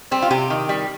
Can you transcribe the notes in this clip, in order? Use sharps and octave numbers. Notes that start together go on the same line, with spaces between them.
G3 C4
F4
C3 G4
D#3
G3